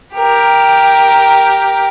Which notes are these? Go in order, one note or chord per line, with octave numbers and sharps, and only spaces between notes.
G4 A#4